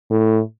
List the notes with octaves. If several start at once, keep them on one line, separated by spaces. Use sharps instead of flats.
A2